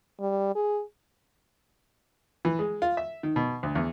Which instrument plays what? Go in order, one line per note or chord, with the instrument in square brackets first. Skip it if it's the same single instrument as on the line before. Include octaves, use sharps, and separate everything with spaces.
[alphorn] G3
G#4
[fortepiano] E3
G#3
F4
E5
D#3
B2
D2
E2